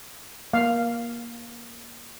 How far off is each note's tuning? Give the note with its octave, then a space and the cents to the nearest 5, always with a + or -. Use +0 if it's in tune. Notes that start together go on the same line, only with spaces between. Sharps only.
A#3 +20 F5 +0